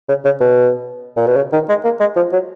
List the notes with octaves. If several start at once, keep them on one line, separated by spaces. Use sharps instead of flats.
C#3
C#3
B2
A#2
B2
C#3
D#3
G#3
A#3
G#3
F3
F#3